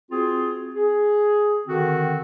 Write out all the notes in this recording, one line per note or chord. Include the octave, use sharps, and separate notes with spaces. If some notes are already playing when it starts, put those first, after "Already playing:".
C4 F4 F#4 G#4
G#4
D3 D#3 C4 F#4